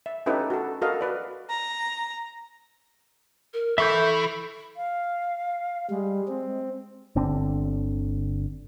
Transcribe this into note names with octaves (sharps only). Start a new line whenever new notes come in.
E5
C#4 D#4 E4 G4 A4 B4
F#4 A4
F#4 A4 A#4 D#5 F5
F#4 B4 D5
A#5
A#4
E3 A4 E5 C#6 G6
F5
G3 G#3
C4
G1 D3 C4